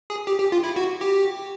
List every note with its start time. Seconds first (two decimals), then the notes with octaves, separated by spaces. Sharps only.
0.10 G#4
0.27 G4
0.40 G4
0.52 F4
0.64 E4
0.76 F#4
1.01 G4